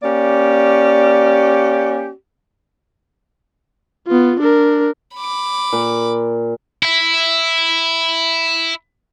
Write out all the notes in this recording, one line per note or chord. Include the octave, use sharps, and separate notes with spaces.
A#3 C#4 G4 D5
B3 F4
D4 A#4
B5 D6
A#2
E4 E5